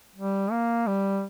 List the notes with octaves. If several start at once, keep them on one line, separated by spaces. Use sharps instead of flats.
G3
A#3
G3